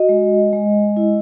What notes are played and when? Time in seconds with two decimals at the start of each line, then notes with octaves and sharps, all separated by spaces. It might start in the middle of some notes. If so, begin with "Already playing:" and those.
Already playing: F#4 D#5
0.09 G#3
0.53 G#3
0.97 E4